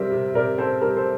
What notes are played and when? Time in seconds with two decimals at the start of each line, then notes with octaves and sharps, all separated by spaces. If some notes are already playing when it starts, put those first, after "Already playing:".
Already playing: C3 G3 C4 A#4 E5
0.12 C3
0.34 C3 A#4 D5
0.58 C4 A4 C5
0.81 G3 A#4
0.96 A4 C5